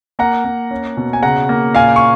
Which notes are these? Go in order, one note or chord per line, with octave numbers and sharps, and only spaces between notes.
A#3 F#5 A#5
A#3
C#4
B2
G#5
C#3 F#5 A#5
A#3
A#2 F5 G#5
C#6